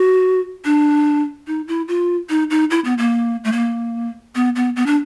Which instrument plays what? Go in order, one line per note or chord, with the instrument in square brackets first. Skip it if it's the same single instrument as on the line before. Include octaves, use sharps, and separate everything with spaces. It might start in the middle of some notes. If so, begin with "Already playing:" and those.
Already playing: [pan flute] F#4
D4
D#4
E4
F4
D#4
D#4
E4
B3
A#3
A3
A#3
B3
B3
B3
D4